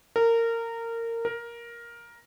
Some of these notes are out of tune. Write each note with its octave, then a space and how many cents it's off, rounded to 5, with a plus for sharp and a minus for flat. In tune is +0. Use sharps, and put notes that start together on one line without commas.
A#4 -20
A#4 +10